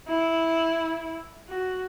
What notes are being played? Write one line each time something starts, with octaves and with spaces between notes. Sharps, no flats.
E4
F#4